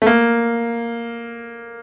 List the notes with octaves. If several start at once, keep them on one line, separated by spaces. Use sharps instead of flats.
A3
A#3